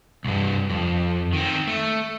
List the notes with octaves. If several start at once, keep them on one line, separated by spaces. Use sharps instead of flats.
C2 G2
F2
D#3 C4
A3